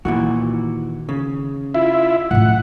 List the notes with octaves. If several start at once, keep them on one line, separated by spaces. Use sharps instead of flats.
A#2 D#3 E3 F#4
C#3
E4 F4 E5
A2 C#4 F#5